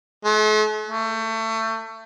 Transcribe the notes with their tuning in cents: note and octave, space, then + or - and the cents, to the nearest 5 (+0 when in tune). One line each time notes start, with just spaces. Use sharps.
A3 -45
A3 +25